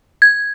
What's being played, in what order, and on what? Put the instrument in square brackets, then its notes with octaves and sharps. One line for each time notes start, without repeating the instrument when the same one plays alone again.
[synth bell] G#6